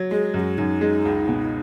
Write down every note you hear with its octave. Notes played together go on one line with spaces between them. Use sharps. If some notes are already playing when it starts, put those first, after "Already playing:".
Already playing: F#3
G#3 G#4
F#2 G#4
F#4
F#2 D#4
G#3
C#2
B2